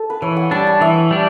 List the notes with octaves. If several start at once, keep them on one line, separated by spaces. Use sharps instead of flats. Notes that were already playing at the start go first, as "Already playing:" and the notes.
Already playing: A4
B4
E3 C#5
F#5
G3 D4 A5
A5
E3 E5
G3 D4